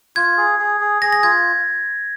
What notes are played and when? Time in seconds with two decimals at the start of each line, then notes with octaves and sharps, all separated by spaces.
0.16 F4 G#6
0.37 G#4
0.59 G#4
0.80 G#4
1.02 G#4 A#6
1.12 A#6
1.23 F4 G#6